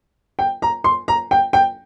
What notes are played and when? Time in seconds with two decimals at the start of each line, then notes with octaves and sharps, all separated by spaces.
0.39 G5
0.62 A#5
0.84 C6
1.08 A#5
1.31 G5
1.53 G5